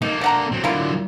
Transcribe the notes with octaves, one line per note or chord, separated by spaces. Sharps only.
A#3 D#4 A4
D3 F#5 A#5
F#3 C4
D3 F#3 A#3 E4 F4